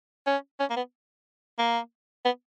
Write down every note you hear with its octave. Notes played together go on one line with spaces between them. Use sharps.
C#4
C#4
A#3
B3
A#3
B3